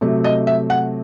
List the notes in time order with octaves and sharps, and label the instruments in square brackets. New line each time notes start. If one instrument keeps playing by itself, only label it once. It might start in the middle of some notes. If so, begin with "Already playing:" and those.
[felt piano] C3 F#3 A3
D#5
E5
F#5